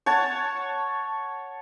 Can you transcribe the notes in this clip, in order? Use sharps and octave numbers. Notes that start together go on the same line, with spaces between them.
C#5 F#5 A5